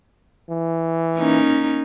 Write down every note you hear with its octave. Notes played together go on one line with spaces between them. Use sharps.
E3
A#3 C#4 D#4